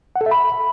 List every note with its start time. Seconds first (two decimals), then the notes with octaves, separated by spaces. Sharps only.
0.16 F#5
0.21 A4
0.26 E5
0.31 B5